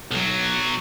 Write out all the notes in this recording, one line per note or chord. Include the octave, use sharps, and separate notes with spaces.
B1 F#3